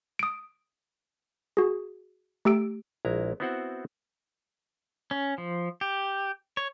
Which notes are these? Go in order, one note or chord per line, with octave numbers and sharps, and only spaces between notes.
D#6 D7
F#4 G#4
A3 G4 E6 D7
A#1 G#3 E4 A#5
B3 C4 E4 F#4 C5 F#5
C#4
F3
G4
C#5